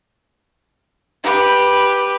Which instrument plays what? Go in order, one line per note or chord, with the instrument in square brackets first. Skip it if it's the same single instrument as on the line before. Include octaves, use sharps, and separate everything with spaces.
[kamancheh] G4 B4